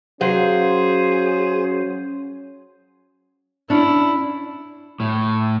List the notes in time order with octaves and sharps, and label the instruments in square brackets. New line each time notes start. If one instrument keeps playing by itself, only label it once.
[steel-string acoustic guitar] F#3 F5 [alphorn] C#4 [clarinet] G#4 [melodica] C5
[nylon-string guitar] C#4 D4 [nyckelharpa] E4
[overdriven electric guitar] A2